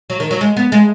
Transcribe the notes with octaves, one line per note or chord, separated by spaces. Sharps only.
F#3
D#3
F#3
G#3
B3
G#3